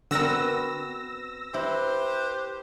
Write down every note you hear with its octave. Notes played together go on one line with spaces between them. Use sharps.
D3 B3 C4 F#4 A#4 E6 A#6
E4 G4 B4 C5